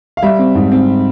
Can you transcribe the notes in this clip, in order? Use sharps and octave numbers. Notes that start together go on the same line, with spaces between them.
F5
G3 E5
C4
G#2
C4